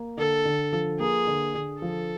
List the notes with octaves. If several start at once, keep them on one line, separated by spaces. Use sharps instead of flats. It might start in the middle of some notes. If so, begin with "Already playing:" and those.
Already playing: A#3
D3 A4
D3
F3
A#3 G#4
D3
D3
F3 A4